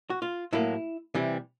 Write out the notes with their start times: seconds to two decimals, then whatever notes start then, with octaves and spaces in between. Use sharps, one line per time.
0.10 F#4
0.22 F4
0.53 A2 F#3 A#3 E4
1.14 C3 E3 G3